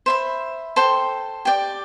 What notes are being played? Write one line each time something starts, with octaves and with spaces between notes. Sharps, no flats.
C5 E5 B5
A4 C5 G5
G4 D5 G5